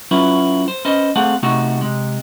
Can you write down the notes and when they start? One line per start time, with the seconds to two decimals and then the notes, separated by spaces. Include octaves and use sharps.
0.11 F#3 C#4 E4 F4 B4
0.68 C5
0.85 C#4 B4 C5 D#5
1.16 A3 C4 G#4 F5 F#5
1.43 C3 A3 C4 D#4 F#4
1.81 C3 G#3